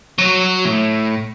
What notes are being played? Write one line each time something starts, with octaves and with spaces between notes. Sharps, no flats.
F#3
A2